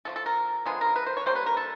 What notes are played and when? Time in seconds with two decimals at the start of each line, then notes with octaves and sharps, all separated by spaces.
0.05 D3 F3 A3 A4
0.16 A4
0.26 A#4
0.66 D3 F3 G#3 B3 G#4
0.81 A#4
0.96 B4
1.06 C5
1.17 C#5
1.26 D3 G3 A#3 C5
1.36 B4
1.46 A#4
1.57 A4